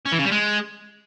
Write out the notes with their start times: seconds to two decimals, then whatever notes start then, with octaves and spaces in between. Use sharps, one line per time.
0.06 C#4
0.12 E3
0.18 C#3
0.25 G3
0.31 G#3